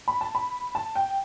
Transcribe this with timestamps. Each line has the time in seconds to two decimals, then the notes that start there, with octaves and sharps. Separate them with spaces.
0.08 B5
0.21 A5
0.35 B5
0.75 A5
0.95 G5